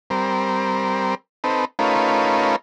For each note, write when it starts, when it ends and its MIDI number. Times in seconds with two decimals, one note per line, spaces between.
0.10 1.15 55
0.10 1.15 60
0.10 1.15 70
1.44 1.65 60
1.44 1.65 63
1.44 1.65 69
1.44 1.65 71
1.79 2.56 57
1.79 2.56 61
1.79 2.56 63
1.79 2.56 65
1.79 2.56 70
1.79 2.56 71